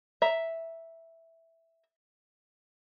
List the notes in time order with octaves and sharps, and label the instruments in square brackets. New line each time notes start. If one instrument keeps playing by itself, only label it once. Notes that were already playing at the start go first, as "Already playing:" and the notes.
[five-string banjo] E5 A#5